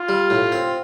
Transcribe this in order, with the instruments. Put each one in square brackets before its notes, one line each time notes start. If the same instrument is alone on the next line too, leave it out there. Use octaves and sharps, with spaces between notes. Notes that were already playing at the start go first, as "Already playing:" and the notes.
Already playing: [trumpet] F4
[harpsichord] G3
A2
C4